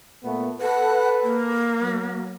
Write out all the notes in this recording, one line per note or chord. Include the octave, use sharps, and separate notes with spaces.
A#2 A3 B3
A4 B4 F#5
A#3
F#3